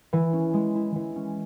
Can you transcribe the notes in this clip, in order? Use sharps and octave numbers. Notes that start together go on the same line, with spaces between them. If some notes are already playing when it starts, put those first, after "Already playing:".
E3
C#4
G#3
E4
E3
C#4